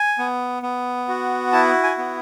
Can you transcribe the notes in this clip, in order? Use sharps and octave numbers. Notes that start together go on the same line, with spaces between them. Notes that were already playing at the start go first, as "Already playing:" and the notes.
Already playing: G#5
B3
B3
F#4
E4 A5
G#5
B3